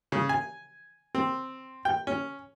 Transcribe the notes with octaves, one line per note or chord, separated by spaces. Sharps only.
C#3
G#5
C4
G5
C#4